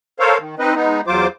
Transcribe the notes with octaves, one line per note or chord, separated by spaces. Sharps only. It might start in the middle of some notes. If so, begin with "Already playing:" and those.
A4 A#4 C5 C#5 F5
D#3
C4 D#4 B4 D#5
G#3 B3 D#4
E2 F#3 F4 C5 D6